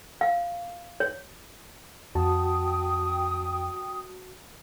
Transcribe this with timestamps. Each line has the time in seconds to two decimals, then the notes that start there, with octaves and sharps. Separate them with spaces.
0.21 F5
1.00 C#5
2.15 F2 F#4 G5 A5 D#6